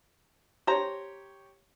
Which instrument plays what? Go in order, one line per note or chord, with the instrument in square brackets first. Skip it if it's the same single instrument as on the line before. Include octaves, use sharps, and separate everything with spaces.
[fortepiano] G4 C#5 [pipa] C5 A#5